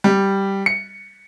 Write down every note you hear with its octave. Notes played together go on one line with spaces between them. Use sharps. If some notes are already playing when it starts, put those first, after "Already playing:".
G3
C#7